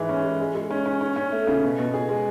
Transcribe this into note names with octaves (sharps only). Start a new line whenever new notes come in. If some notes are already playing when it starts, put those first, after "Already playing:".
Already playing: G#2 E3 G#3
C#4
G#3
G#3
G#3
C#4
C#4
C#4
C#4
A3
C#3
B2
B2
G#4
G#3